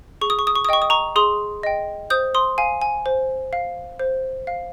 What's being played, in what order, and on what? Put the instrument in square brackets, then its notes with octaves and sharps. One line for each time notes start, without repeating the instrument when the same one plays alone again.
[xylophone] G#4 C#6
D#6
C#6
D#6
C#6
D#6
D#5 G5 C#6
D#6
A#5 C#6
G#4 C6 D#6
D#5 G5
C5 D#6 G6
C6 D#6
F5 G#5
G#5
C5
F5
C5
F5